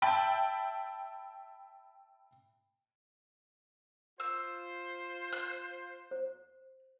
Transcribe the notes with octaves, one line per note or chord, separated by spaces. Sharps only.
E5 G5 A5 B5
F4 C5 E6
F#6
C5